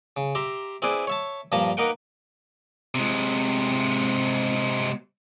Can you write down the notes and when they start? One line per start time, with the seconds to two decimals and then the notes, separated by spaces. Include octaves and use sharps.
0.17 C#3
0.35 G4 E5 A#5 C6
0.82 C4 E4 G#4 B4 C5 D5
1.07 C#5 E5 A5
1.52 G2 A#2 F3 A#3 A5 A#5
1.77 A#3 D#4 A#4 B4 F#5 G5
2.95 C3 G#3